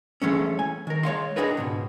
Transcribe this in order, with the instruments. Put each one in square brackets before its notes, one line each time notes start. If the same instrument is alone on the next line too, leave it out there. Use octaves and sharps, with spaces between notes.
[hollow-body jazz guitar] E3 G#3 A3 C#4
G#5
D#3 A#4
G#3 C#5 F5 C6
D4 D#4 F#4 G#4 A#4 B4
C#2 G#2 B2